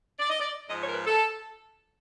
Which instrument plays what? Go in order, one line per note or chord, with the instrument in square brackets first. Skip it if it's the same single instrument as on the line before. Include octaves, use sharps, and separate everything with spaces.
[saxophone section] D5
D#5
D5
G#2 F3 D#5
C#5
A#4
B4
A4